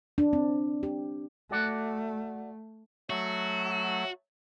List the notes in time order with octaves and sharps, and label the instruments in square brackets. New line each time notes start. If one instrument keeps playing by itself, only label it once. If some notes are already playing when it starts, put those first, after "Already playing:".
[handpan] D4
C4
G4
[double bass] A3 [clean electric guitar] F#4 D5 F#5
[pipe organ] F#3 A3 [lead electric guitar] F#4